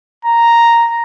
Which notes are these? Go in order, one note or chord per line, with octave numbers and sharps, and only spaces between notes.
A#5